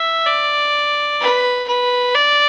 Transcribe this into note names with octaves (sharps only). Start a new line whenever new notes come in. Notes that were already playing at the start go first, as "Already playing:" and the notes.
Already playing: E5
D5
B4
B4
D5